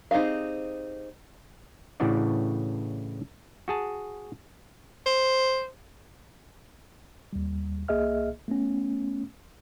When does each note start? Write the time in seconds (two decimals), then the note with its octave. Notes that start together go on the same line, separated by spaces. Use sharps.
0.11 C4 D#4 G4 G#4 F5
2.00 A2 C#3 E3 D4 F#4 D5
3.68 F#4 G#4 A5
5.06 C5
7.33 D#2 G3
7.88 C2 A#3 G#4 D#5 E5 F6
8.48 A3 B3 C#4